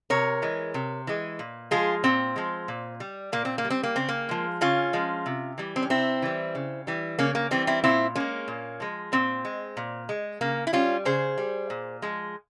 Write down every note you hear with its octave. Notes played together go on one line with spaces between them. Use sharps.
C3 A#4 C#5
E3 G#3
C3
E3 G#3
A#2
F3 G#3 F4 G#4
A#2 C4
F3 G#3
A#2
G3
A#2 A#3
C4
A#3
G3
C4
A#3
C#3 C4
A#3
F3 G#3
C#3 C#4 F4
F3 G#3
C3
E3 G3
C4
C#4
C3 C4 E4
E3 G3
C#3
E3 G3
C#3 A#3 C#4
A#3
E3 G3 C4
C4 E4
A#2 C4 E4
F3 G#3 A#3 C#4
A#2
F3 G#3
A#2 C4
G#3
A#2
G#3
C#3 A#3
E4
G3 C#4 F4
C#3 G#4 C5
G3
A#2
F3 G#3